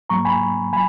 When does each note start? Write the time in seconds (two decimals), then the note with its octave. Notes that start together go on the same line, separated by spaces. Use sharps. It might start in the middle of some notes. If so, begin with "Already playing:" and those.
0.10 G#2 F#3 A#3 A#5 C#6
0.25 G#5 B5
0.72 F#3 G#5 B5